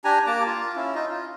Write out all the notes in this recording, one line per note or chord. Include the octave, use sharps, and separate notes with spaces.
D4 G4 G#5 A#5
A#3 A5 A#5 D6
F4
C#4 E4
D#4 F4 D#5
F4